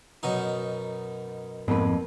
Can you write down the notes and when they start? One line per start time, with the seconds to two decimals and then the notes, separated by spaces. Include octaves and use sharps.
0.23 F#2 B2 D#4
1.68 F2 G#2 A#3 B3 B4